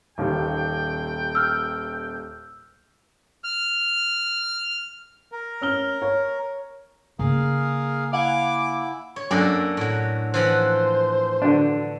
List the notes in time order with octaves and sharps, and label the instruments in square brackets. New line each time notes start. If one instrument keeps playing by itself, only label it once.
[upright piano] D#1 D#2 D#3 [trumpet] G5
[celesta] E6 F6 G6
[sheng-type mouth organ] F6
[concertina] A#4
[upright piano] C#4 F6 G7
C#5
[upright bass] C#3 A#3 [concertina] G#4 A#4 F5
[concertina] E4 [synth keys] F5 F#5 G#5 [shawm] D6
[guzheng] C#5
[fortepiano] F#2 [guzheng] A#3 D4 A4
[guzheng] A2 F#3
[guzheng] E3 F3 F#5 [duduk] C5
[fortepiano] D3 F#3 D4